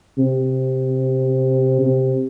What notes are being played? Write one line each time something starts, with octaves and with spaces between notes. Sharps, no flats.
C3
C3